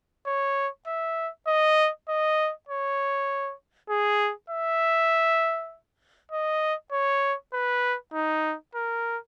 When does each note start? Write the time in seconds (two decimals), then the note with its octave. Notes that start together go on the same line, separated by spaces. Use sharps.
0.26 C#5
0.87 E5
1.47 D#5
2.09 D#5
2.69 C#5
3.90 G#4
4.50 E5
6.32 D#5
6.92 C#5
7.54 B4
8.13 D#4
8.75 A#4